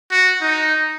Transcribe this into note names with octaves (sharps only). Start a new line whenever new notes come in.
F#4
D#4